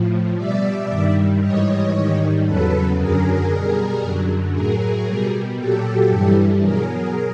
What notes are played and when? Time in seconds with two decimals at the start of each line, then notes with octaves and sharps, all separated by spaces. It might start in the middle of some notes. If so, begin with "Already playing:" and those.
Already playing: A2 F3
0.36 B2 G3 D5 E5
0.89 G2 D#3 G3
1.40 G#2 E3 G3 C#5 D#5
1.93 G#2 D#3 G3
2.45 E2 C#3 F#3 A4 B4
2.98 F#2 D3 F#3 G#4 A#4
3.49 B2 G3
4.02 F#2 D3 F#3
4.53 A2 F#3 G#4 A#4
5.06 B2 G3
5.57 A#2 F#3 G4 A4
6.09 G2 E3 G3
6.62 B2 F#3 G#4 A#4